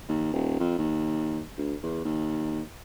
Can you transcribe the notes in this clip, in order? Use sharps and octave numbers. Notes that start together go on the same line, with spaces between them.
D#2
D#1
F2
D#2
D2
E2
D#2